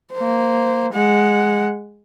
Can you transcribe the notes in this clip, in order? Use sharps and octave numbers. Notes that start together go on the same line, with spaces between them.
A#3 C5
G#3 F#5